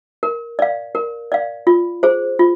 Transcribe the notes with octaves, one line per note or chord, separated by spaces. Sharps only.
A#4
D5 F5
A#4
D5 F5
F4
G#4 C5
F4